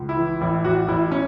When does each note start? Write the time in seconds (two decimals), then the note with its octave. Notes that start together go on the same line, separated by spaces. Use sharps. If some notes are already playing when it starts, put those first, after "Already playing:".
Already playing: C#2
0.09 E4
0.17 E3
0.41 A1 E4
0.65 A1 F#4
0.88 A1 E4
1.11 C#4